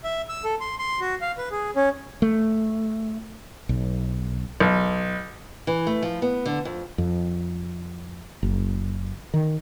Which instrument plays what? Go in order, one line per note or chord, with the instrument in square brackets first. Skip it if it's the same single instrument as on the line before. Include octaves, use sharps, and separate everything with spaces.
[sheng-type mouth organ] E5
E6
A4
C6
C6
F#4
F5
B4
G#4
C#4
[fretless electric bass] A3
B1
[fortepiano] B1
[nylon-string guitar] E3
A3
F3
B3
D3
F2
[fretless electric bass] F2
F#1
D#3